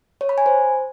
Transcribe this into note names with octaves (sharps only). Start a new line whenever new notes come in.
C#5
B5
G#5
C5